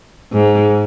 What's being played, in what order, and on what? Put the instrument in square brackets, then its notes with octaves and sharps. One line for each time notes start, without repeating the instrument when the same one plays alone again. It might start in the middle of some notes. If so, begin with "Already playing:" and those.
[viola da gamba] G#2